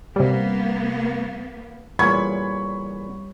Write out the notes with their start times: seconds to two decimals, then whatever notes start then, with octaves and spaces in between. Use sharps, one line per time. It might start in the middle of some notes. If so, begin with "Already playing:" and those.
0.16 C3 G3 A#3 B3
1.99 E2 A#2 G3 C#5 B5 C#6 G#6